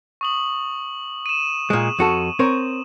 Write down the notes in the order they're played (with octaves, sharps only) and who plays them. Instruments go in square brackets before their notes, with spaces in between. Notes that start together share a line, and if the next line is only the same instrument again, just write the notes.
[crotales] C#6 D#6 F#7
D#7 E7
[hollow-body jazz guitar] A#2 G#3
F2 F#4 A4
C4 A#4 C#5